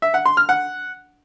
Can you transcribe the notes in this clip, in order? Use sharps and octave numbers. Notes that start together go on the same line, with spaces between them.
E5
F#5
C6
F6
F#5